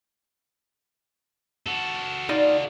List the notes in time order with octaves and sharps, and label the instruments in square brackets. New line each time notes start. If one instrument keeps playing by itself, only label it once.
[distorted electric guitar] F#4 A4
[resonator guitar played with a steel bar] D#4 F4 D5